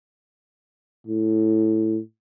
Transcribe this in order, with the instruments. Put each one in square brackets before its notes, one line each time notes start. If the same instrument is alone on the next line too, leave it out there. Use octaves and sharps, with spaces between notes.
[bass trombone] A2